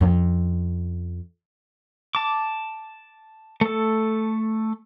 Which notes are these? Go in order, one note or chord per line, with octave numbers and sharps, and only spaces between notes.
F2 C#4
A5 D6
A3 A4